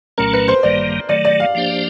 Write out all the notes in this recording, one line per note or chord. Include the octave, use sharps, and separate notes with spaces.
C2 A#2 F#3 A3 C#4 A#4
B4
C5
A1 G2 D#3 G3 A#3 D5
D#3 F#3 A3 D5
D5
F5
F3 A#3 D4 G4 C5